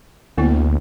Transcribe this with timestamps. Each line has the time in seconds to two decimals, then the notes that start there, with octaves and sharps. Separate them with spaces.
0.37 D2 A#3 B3 E4